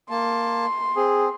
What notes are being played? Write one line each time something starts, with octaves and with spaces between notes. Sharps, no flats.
A#3 A5 C6
C4 G#4